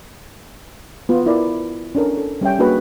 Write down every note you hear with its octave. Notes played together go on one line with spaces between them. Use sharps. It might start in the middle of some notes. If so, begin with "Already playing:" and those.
B3 F4
E4 A#4 D5
C#4 D4 A4 A#4
A4
G3 C#4 E5 G5
A#3 D4 F#4 G#4 B4